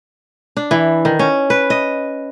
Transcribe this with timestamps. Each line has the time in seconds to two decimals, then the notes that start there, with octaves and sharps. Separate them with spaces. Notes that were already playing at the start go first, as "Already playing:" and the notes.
0.57 D4
0.71 E3
1.05 D#3
1.19 C#4
1.50 B4
1.70 D#5